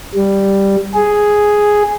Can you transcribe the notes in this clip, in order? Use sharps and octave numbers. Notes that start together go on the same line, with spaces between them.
G3
G#4